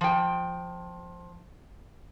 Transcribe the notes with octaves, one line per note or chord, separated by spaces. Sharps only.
F3 G5